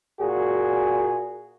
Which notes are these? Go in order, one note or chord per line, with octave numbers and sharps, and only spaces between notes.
A#2 F#4 G#4